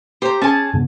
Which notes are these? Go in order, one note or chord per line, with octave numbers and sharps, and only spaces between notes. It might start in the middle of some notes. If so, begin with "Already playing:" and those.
G4 C5 A#5
C#4 G#4 G#5 A5
G2 C#3 B3